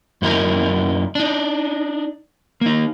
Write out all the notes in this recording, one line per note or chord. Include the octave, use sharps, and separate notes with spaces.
F#2 A#3 D#4 E4 A#4
D4 D#4
A#3 D#4